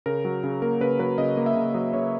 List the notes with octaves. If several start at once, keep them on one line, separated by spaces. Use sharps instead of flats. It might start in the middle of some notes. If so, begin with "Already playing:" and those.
C#3 A#4
F#3
C#3
A#3 A#4
C#3 B4
F#3 B4
C#3 D#5
A#3
E5
C#3
F#3 D#5
C#3 C#5